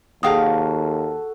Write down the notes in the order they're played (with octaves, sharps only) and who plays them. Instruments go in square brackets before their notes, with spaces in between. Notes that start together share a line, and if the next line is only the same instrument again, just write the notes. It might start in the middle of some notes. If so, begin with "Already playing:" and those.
[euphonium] D#2 [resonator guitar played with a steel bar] A#3 F5 [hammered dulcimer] F#4 A4 [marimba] G#4 G5 D#6